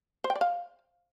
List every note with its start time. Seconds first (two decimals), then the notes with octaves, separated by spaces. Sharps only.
0.24 C5
0.30 G5
0.35 D5
0.41 F5